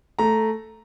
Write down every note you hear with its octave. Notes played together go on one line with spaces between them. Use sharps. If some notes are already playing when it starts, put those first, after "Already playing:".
A3 A#5